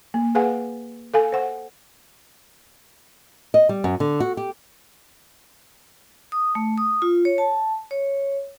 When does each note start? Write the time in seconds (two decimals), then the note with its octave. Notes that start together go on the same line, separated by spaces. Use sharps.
0.14 A#3
0.35 G#4 B4 F5 F#5 G#5
1.14 A4 F5 G#5
1.32 C5 F#5
3.54 D#5
3.69 G3
3.84 F#2
4.00 D3
4.20 F#4
4.37 G4
6.32 D#6
6.55 A3
6.78 D#6
7.02 F4
7.25 C#5
7.38 A5
7.91 C#5